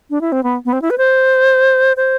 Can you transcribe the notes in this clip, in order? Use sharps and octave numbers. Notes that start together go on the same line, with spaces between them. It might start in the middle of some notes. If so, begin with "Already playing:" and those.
D4
E4
C4
B3
B3
C4
E4
B4
C5
C5